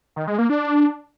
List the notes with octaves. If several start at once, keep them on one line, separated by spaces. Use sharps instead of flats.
D#3
G#3
A#3
D4